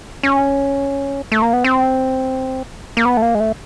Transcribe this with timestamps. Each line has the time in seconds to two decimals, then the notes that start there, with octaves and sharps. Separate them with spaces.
0.23 C#4
1.32 A3
1.42 A#3
1.53 B3
1.64 C4
2.97 A#3
3.05 B3
3.17 A3
3.22 A#3
3.35 G#3
3.40 A3